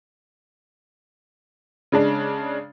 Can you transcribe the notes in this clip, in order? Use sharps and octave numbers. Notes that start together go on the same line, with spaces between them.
C#3 G#3 D4